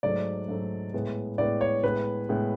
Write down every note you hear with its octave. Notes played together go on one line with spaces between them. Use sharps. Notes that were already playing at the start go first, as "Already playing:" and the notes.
G#2 F#3 A3 D5
G#2 F#3 A3
A2 G#3 B3
A2 G#3 B3 D5
C#5
A2 G#3 B3 B4
A2 G#3 B3